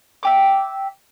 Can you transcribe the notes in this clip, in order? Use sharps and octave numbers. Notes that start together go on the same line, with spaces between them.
E5 G5 D6